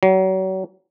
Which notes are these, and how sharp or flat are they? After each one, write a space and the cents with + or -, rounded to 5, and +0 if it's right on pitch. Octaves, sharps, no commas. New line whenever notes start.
F#3 +35